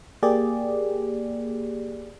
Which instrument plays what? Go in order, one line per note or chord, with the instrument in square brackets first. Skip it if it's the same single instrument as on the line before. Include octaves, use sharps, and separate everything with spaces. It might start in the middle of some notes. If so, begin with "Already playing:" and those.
[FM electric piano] A#3 G4 G#4 D5